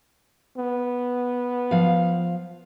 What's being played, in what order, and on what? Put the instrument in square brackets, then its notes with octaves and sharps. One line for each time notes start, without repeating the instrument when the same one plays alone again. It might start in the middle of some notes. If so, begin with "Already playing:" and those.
[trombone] B3
[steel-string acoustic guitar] F3 F5